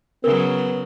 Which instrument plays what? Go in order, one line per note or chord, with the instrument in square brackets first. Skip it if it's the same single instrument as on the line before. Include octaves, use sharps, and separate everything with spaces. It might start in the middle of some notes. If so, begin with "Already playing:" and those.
[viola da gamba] C#3 F#3 [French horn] B3 [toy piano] A#4